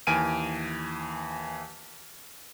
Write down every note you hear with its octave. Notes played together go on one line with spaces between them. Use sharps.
D#2 E3 G#5 F6 D7 D#7